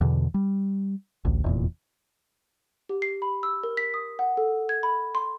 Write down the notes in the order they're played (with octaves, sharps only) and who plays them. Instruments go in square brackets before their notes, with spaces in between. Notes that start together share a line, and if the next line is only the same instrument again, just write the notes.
[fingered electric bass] E2 B2 D3
G3
A1 D2
F1 E2 A#2
[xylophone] G4
C7
B5
E6
A#4
B6
D#6
F#5
A4
G#6
B5
C6